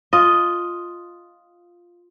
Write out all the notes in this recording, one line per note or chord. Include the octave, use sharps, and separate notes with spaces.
F4 D#5